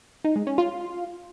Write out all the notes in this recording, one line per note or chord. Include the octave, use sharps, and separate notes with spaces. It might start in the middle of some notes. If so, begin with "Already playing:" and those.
D#4
G#3
C#4
F4